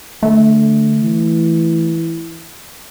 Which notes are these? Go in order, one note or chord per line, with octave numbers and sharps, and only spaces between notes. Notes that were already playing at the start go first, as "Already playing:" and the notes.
D3 A3
E3